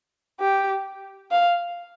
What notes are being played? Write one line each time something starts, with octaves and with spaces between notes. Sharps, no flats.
G4
F5